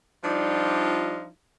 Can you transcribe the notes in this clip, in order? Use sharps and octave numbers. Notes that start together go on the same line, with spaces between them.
F3 G3 D4 D#4 F4